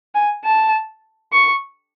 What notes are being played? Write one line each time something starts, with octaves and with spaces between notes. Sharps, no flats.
G#5
A5
C#6